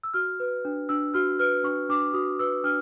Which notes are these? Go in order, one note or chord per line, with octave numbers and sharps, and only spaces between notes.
E6
F#4 F6
B4
D4
D4 E6
F#4 F6
B4 F6
D4 C#6
D4 D6
F#4 D#6
B4 E6
D4 F6